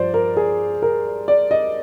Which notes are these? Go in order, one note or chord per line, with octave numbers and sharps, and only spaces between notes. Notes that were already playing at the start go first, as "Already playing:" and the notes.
Already playing: G2 F3 C5 D5
A#4
G#4
A#4
D5
D#5